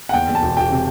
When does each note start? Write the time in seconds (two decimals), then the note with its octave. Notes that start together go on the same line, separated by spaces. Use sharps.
0.09 F#5
0.13 E2 G5
0.29 E2
0.35 A5
0.43 E1
0.57 E1 G5
0.71 C3